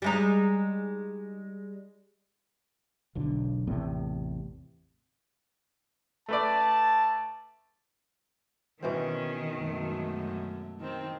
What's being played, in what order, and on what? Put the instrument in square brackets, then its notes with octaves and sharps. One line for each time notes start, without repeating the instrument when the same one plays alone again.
[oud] G3 G#3 D#4
[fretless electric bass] E1 B1 D3
A1 E2 A2 C3
[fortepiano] A3 B4 D5 [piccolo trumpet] A5
[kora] B2 E3 C4 [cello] D#3 [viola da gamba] C#4
[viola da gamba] F#2 G#3 A3
D#3 C4